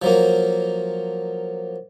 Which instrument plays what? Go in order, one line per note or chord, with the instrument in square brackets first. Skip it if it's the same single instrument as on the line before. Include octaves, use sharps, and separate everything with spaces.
[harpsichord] F3 F#3 A#3